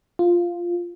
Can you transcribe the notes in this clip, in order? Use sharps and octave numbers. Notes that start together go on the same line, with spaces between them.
F4